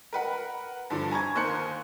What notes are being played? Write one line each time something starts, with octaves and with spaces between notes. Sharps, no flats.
A#4 B4 F#5
G2 D3 F3
G#5 A#5 C#6 G#6
D#2 A#4 C5 F#6 C#7